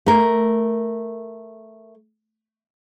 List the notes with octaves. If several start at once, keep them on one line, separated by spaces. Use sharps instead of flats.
A3 A#4